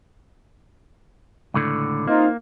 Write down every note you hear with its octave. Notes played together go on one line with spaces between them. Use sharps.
C#2 A2 D3
A#3 C4 D#4 F4